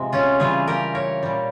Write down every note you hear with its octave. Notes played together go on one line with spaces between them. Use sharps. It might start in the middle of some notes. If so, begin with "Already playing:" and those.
Already playing: C3 F3 G#3
C#4 F4
C#3 E3 G3 F4 G#4
G4 A#4
A#4 C#5
A#2 G3